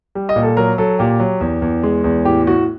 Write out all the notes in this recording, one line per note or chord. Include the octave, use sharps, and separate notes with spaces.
G3
D#5
A#2
A4
F#3 A#4
F#3 A4
A#2 G4
F#3
E2
E2
G#3
E2
A2 G4
A2 F#4